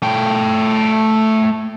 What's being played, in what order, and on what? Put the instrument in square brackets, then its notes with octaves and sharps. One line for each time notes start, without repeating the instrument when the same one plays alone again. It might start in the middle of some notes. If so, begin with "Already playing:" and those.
[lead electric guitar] A3 G5